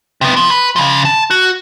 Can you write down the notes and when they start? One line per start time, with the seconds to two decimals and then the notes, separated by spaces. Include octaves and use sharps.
0.21 C3 B3
0.36 F3
0.50 B4
0.76 C#3 F3
1.05 A5
1.31 F#4